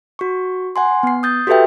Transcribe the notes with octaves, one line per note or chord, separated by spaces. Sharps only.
F#4 C#6
F#5 G#5 C6
B3 C7
D#6 G6 A6
F#4 G4 A4 B4 E5 G5